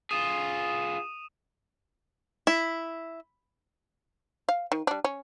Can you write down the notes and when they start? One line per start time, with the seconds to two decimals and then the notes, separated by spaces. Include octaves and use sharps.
0.11 F4 G#4 D#6 D#7 E7
2.47 E4
4.49 F5
4.72 D#3
4.87 G3 D4
5.05 C#4